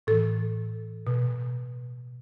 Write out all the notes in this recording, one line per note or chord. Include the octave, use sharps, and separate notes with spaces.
A2 E3 A4
B2